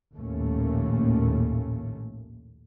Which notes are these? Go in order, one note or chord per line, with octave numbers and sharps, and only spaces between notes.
A#1 D#2 A2 A3 A#3 C#4